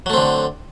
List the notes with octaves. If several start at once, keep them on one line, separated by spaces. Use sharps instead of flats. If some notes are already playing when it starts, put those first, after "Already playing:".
D3 F#3 A3 C4